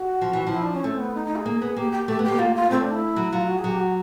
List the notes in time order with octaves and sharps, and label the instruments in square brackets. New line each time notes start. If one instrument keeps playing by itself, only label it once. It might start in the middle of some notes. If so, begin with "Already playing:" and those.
Already playing: [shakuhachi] F#4
[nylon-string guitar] F3
E3
F3
[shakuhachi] E4
D4
C#4
[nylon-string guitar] A3 [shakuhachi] C4
[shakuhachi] B3
D#4
D#4
G#4
[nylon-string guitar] A#3
B3
[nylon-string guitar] A#3 [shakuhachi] G4
[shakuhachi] G4
[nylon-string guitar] A3 [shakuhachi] G4
[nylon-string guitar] B3
[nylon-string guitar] A#3 [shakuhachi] G4
[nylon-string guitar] A#3 [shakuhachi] F4
[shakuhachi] F4
[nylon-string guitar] A3 [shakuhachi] C4
[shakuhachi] D4
E4
[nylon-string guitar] F#3
[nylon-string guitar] F#3 [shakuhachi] F4
[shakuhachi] F#4
G#4
[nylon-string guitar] F#3
[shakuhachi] G4
F#4